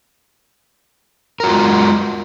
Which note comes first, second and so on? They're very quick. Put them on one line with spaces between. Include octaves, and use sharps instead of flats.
A#4 F#4 F4 G#3